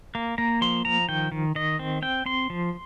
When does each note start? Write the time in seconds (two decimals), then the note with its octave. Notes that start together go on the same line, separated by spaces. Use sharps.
0.15 A#3
0.38 A#3 A#5
0.61 F3 C6
0.85 F3 A#5
1.08 D#3 G5
1.32 D#3
1.55 D#3 D#5
1.79 C4
2.02 C4 G5
2.26 C4 C6
2.50 F3